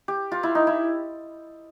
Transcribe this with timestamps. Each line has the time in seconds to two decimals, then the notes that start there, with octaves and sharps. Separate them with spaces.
0.08 G4
0.32 F4
0.43 E4
0.55 D#4
0.67 E4